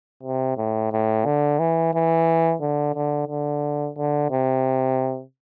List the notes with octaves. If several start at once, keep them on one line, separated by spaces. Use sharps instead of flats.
C3
A2
A2
D3
E3
E3
D3
D3
D3
D3
C3